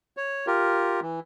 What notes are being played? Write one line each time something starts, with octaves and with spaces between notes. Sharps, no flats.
C#5
F4 G4 A#4
E3